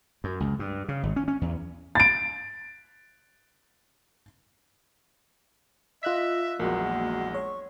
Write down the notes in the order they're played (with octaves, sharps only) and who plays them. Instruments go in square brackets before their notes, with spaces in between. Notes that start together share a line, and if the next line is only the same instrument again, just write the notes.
[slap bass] F#2
C#2
G2
C#3
G#1
C#4
C#4
E2
[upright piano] A6 D7
[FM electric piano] F4 F#6 B6 [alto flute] D#5 [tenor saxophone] E5
[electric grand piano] A#1 E2 F#3 [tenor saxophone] G#3 [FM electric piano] A#3 [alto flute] F#4
[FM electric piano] C#5 [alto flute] C#6